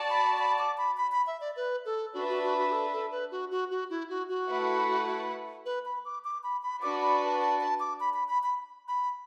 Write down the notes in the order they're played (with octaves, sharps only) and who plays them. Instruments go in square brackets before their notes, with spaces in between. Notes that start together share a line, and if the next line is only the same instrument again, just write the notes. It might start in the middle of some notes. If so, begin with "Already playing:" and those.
Already playing: [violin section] F#4 D5 A5
[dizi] B5
B5
D6
B5
B5
B5
E5
D5
B4
A4
[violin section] D4 B4 E5 [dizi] F#4
[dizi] F#4
F#4
F#4
F#4
A4
A4
B4
F#4
F#4
F#4
E4
F#4
F#4
[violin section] A3 E4 B4 F#5
[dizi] B4
B5
D6
D6
B5
B5
[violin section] D4 F#4 B4 D5 [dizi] D6
[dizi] B5
A5
A5
A5
D6
B5
B5
B5
B5
B5